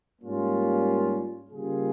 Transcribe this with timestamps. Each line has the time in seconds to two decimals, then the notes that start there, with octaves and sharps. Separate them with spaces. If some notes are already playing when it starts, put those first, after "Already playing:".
0.22 G#2 G3 A#3 C#4 F4
1.51 C#3 G3 A#3 F4 G#4